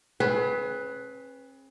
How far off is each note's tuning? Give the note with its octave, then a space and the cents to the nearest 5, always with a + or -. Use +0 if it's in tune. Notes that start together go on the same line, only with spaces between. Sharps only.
C#4 -45 G#4 +35 B4 +0